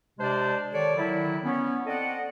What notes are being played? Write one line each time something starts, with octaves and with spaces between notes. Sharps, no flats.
C3 G#3 D4 C5 D5 A5
D#3 A4 C#5 D5
D3 D#3 F#3 E4
B3 C#4
C4 A4 D5 D#5 F#5